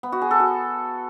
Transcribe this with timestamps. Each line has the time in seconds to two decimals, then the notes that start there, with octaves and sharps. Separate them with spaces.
0.03 B3
0.12 F#4
0.22 G#4
0.31 A4
0.40 F#4